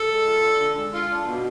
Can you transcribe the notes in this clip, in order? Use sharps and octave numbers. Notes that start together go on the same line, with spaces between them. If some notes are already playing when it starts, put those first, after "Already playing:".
Already playing: A4
G#3
F4
D4
D3
G#3
F4
D4
B2